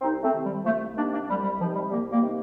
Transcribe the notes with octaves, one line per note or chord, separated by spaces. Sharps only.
C2 C4 D#4
A3 C4
C3 D#3
G3
C2 F3 A3
C3 D#3 A#3 D4
A#3 D4
C2 G3
G3
C3 D#3 F3
G3
C2 G3 A#3
G3 A#3
C3 D#3